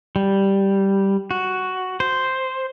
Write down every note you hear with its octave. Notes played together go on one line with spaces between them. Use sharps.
G3
F#4
C5